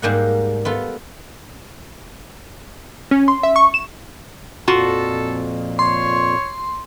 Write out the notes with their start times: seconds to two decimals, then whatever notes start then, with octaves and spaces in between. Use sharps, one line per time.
0.02 G#2 G3 A#3 F#5
0.65 B3 F4 A4
3.11 C#4
3.28 C6
3.43 E5
3.56 C#6
3.74 E7
4.68 F2 A#2 F4 F#4 A4
5.79 C#5 C6